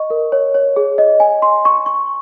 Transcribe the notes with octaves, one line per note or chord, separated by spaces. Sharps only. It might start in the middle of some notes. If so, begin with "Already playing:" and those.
Already playing: D#5 C#6
A#4
C#5
C#5
G#4
D#5
G#5
C6
C#6
C#6